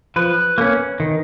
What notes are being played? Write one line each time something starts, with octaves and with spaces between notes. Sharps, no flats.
F3 B4
A#3 C#4
D#3